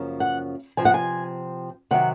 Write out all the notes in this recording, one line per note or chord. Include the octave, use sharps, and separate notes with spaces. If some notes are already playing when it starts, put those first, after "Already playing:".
Already playing: F#2 C#3 F3 A#3
F#5
C3 F3 C4 G#5
F#5
G#5
C3 D#3 F#3 F#5